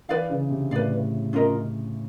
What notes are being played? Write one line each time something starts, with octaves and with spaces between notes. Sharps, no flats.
E3 B4 D5 F5
C#3
C3
A2 B4 D5 F5
C#4 F4 A#4 D#5